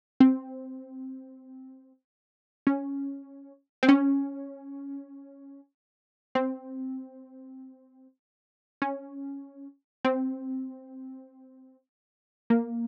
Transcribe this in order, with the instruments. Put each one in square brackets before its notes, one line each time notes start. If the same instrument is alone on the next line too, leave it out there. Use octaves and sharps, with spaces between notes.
[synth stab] C4
C#4
C4
C#4
C4
C#4
C4
A#3